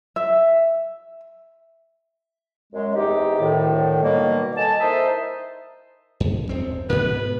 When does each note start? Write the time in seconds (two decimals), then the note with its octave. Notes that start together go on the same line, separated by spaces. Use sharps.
0.16 E5
2.73 F#2 G#3
2.95 E2 C3 D#4 G4
3.40 D2 A2 D#3
4.02 B2 D#3 F#3 G3 A#3
4.57 A4 D#5 G#5 A5
4.80 D#4 E4 A#4 C5 D#5 E5
6.20 F#2
6.49 D#1 C4
6.90 G#2 B2 B4